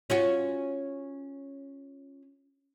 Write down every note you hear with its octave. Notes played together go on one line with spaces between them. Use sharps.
C#4 F4 F#4